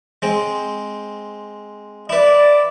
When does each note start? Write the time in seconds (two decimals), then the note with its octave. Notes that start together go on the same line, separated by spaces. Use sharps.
0.22 G#3 C4
2.09 E4 B4 D5